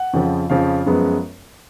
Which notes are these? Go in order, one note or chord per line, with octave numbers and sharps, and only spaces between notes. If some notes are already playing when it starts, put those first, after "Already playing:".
Already playing: F#5
F2 C#3 F3
F2 C#3 F3 F5
F#2 F3 G#3 B3